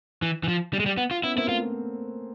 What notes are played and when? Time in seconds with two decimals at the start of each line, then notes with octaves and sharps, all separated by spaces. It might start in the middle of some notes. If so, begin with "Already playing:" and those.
0.22 E3
0.43 E3
0.48 F3
0.73 G3
0.80 G#3
0.86 G3
0.97 B3
1.11 F4
1.23 B3 C#4 E4
1.35 A#3 C4 E4
1.48 A3 B3 F4